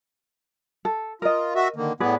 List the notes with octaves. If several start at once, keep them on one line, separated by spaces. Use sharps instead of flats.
A4
F4 A#4 D#5
F#4 E5
D3 D#3 A#3
A2 B3 G#4 B4 D5